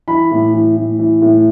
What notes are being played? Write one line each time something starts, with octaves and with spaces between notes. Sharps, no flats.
E3 B5
A2
E3
A2
E3
A2